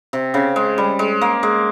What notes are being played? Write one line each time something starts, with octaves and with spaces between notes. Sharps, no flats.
C3
C#3
G#3
G3
G#3
A#3
G#3